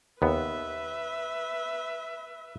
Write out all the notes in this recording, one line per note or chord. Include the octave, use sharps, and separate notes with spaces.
D#2 B3 B4 E5